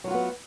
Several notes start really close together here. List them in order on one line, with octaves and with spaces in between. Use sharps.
F#3 F4 F#4 B3